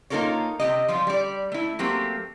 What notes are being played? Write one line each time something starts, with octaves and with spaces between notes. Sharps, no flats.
A#3 D#4 F4 A4 A#4 C#5
C3 F#3 G4 D#5
F3 G3 F4
G3 D5
A3 E4
F#3 A3 A#3 C4 G4